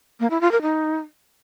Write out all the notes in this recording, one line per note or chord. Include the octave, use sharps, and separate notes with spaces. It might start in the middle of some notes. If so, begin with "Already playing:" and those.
A#3
E4
F4
A#4
D#4